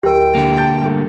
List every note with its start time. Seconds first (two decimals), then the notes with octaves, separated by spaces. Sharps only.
0.03 D1 G4 A#4 G5
0.35 D3 A#3
0.57 A5 G6 A6
0.81 G2 A3